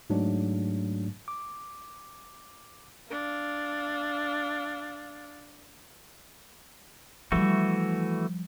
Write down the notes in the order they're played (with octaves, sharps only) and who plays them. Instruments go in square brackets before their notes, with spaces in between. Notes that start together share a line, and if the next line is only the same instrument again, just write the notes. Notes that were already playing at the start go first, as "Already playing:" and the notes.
[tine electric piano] G#2 F#3 A3 D4
D6
[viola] D4 F5
[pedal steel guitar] E3 A3 F#4 [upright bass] F3 G3